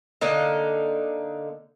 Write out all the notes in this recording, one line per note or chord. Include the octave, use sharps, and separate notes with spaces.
D3 A#3 D#4 D#5